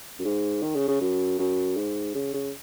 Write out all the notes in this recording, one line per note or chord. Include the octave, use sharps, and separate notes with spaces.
F#2
G#2
D#3
C#3
C#3
F#2
F#2
G#2
C#3
C#3